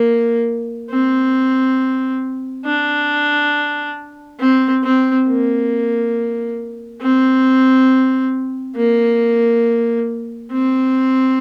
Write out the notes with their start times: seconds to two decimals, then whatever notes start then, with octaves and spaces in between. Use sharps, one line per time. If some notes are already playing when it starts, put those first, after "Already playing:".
Already playing: A#3
0.90 C4
2.65 D4
4.40 C4
4.83 C4
5.28 A#3
7.01 C4
8.76 A#3
10.52 C4